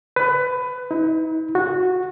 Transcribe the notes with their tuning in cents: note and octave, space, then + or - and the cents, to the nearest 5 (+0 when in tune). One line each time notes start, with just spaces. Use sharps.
B4 +20
D#4 +45
F#4 -15